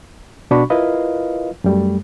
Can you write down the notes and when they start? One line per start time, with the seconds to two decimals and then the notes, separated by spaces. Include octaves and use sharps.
0.51 B2 D4 F#4 D5 B5 C#6
0.70 E4 F4 A#4 B4 D#5 F5
1.64 F#2 G3 A3